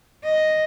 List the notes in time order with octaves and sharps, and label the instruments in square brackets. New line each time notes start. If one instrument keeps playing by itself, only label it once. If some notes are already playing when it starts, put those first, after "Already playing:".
[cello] D#5